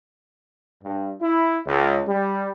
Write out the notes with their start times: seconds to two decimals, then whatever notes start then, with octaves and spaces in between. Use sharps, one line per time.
0.83 G2
1.20 E4
1.67 C#2
2.06 G3